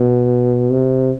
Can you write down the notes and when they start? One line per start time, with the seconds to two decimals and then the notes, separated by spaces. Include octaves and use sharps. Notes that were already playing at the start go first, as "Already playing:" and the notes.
Already playing: B2
0.70 C3